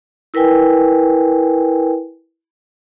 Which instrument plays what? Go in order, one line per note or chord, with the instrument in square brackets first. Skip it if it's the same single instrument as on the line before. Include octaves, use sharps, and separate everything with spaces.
[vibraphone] E4 A#4 B4 G5 G#5